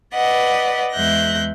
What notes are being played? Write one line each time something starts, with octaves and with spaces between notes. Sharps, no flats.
B4 D5 D#5 F#5
E2 G#3 E5 F#6 G6 A#6